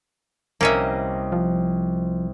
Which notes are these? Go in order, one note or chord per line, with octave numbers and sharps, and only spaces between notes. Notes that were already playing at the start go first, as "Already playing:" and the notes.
C2 A#3 C#4 D#5 E5
F3